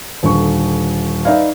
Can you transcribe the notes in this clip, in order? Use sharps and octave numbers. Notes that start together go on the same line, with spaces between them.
D#1 D3 C#6
D#4 B4 D5 E5 F5